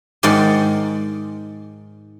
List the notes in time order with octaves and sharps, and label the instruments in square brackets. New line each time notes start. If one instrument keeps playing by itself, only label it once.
[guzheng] G#2 D#3 G#3 D5 F#5 C6